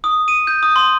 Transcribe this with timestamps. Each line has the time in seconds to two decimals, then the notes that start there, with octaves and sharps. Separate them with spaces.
0.04 D#6
0.28 D#7
0.47 G6
0.63 D#6
0.76 C6